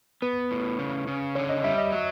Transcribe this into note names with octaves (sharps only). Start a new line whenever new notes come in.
B3 B4
A2
C#3
C#3
D3 C#5
D#5
G3 E5
D#5
F#3